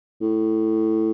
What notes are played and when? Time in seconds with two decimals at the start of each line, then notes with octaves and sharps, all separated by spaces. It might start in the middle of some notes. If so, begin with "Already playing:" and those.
0.21 A2